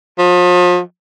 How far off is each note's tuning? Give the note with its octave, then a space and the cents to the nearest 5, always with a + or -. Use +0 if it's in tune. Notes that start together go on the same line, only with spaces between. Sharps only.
F3 +35